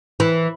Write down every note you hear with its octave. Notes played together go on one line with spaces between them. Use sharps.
E3